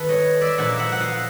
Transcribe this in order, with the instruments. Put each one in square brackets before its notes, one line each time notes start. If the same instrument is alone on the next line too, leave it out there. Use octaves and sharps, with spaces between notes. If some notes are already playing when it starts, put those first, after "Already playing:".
Already playing: [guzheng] D#3 A4 B4
C#5 D#5
D5 E5
A#2 F3 A#3 D#4 E5 F#5
E5 F#5
F#5
D#5 F5